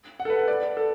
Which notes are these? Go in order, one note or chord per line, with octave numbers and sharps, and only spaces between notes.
F#5
A4
B4
A4
D5
A4